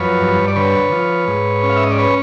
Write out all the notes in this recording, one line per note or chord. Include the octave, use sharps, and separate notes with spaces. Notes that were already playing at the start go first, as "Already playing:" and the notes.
Already playing: F#2 F3 B4 C#5
G2
D5
D3 B4 C#5
F3
G#2
C#4
F5
E5
D#5
D5
B4 C#5